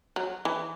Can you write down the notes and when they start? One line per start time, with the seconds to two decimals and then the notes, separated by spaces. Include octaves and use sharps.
0.16 F#3
0.45 E3